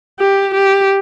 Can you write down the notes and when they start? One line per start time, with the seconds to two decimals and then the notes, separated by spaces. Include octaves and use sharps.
0.20 G4
0.54 G4